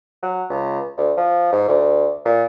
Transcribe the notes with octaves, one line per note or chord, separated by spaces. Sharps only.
F#3
C#2
D2
F3
G#2
D2
A#2